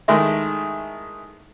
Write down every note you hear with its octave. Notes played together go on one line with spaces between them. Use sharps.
D#3 G#3 A3 E4